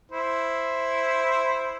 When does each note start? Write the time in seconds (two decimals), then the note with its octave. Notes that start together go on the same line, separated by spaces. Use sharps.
0.12 E4 C5